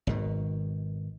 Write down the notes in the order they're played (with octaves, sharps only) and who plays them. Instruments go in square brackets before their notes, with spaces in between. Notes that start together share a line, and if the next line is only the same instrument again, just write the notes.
[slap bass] G#1 B2 D#3